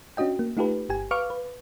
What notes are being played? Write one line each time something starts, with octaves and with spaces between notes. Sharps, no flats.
C#4 D4 F#4 D#5 G5
A#3
A3 D#4 F4 G4 A4 B4
G1 G4 G#5
B4 F5 C#6 D6 F6
B4